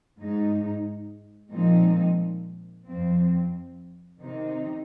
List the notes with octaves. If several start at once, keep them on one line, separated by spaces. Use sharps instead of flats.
G#2 G#3 D#4
A#2 F3 G#3 C4 D#4
F2 F3 C4
C3 D#3 C4 D#4